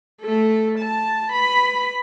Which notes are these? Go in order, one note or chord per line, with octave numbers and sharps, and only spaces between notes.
A3 A4
A5
B4 B5